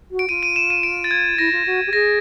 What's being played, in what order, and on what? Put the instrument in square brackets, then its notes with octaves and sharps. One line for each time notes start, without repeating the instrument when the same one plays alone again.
[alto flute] F#4
[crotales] D7
[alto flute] F4 [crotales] D#7
[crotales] D#7
E7
D#7
D7
A6
G#6
[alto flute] E4 [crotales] A#6
[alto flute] F4
F#4
G4
[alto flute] G#4 [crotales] A#6